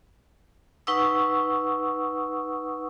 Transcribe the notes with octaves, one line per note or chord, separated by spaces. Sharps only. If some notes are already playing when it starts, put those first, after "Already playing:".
D#4 B4 F#5 C#6 D#6 E6